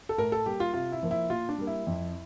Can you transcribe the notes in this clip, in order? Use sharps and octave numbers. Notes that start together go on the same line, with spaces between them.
A4
A2 A#4
A4
G3 A#3 G4
F4
C3 F4
E4
F3 A#3
E4
A#2 F4
D4
G3 A#3
E4
F2